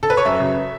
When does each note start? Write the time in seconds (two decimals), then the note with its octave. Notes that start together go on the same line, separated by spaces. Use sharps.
0.03 A4
0.10 B4
0.17 C#5
0.25 F#2 E5
0.40 C#3 F#3